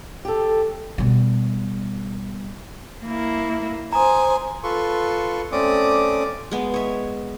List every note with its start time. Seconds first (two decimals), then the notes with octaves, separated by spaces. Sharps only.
0.25 G4 A4
0.98 B2 G3
3.04 A#3 E4
3.93 C5 G#5 A#5 D#6
4.63 F4 A4 B4 C6 C#6
5.52 A3 C4 C#4 D5 D6 D#6
6.51 G#3 B3
6.74 C#5 E5